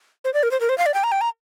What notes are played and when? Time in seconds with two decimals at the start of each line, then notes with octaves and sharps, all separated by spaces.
0.25 C5
0.34 D5
0.43 A#4
0.51 C5
0.61 A#4
0.69 C5
0.78 F5
0.86 D5
0.94 G5
1.04 A#5
1.12 G5
1.21 A#5